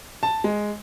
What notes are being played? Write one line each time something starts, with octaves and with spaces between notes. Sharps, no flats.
A5
G#3